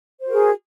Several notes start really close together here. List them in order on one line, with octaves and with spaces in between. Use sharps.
C5 F#4 A#4 G#4